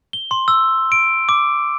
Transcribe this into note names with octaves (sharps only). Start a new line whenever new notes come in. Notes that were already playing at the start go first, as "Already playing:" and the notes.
G7
C6
E6
D7
D6